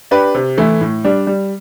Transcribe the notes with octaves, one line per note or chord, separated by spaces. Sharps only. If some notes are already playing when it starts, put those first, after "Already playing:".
D4 G4 B4
C3
E3 A3 E4
A2
G3 D4
G3